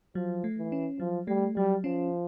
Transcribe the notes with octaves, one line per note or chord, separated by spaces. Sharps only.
F3 F#3
A3
E3
C#4
F3 F#3
G3 A3
F#3 G3
F3 C#4